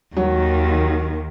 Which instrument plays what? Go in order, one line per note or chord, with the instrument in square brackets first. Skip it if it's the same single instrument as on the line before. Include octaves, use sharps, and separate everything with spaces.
[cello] D#2 D#3 [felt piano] F#3